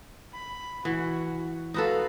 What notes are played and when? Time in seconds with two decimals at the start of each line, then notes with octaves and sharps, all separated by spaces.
0.33 B5
0.85 E3 F#4
1.74 D#4 F#4 A4 B4 F5